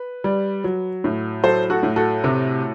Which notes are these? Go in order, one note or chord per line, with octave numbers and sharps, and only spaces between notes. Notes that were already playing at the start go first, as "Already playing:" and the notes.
Already playing: B4
G3
F#3
A2
F#3 A4 C5
F#4 A4
A2
F#4 A4
C3